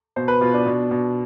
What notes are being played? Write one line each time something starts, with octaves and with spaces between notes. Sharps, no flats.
B2 C5
B4
B2 F4
D4
B2
B2